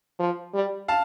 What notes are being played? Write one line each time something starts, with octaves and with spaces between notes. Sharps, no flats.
F3
G3
F5 A5